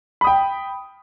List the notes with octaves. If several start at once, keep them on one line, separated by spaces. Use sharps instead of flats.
G5 B5 D#6